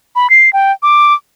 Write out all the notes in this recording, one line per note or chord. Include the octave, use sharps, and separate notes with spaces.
B5
C7
G5
D6